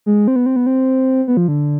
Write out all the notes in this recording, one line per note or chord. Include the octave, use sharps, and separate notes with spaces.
G#3
C4
B3
C4
B3
C4
B3
F3
D3